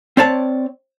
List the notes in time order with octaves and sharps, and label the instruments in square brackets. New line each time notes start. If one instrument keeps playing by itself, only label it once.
[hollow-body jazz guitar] C4 C#5 D5 A5